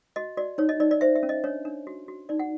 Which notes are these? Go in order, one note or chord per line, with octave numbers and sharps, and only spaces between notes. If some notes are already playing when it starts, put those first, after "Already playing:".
F#4 D#5
F#4 D5
D#4 C#5
D#5
D#4 D5
D5
C5 E5
E5
C#4
D#5
D4 C#5
D4
F#4
F#4
D#4 D5
F#5